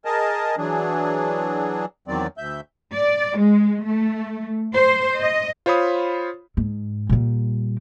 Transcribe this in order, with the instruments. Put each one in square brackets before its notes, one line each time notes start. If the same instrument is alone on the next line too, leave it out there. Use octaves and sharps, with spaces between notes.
[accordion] G#4 A#4 D#5 A5
E3 F#3 D4 G#4
E2 D#3 F#3 C4 D5
D2 E5 G6
[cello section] D5
G#3
A3
C5
D#5
[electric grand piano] F4 C5 C#5 B5 D#6
[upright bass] G#2
A#2 G3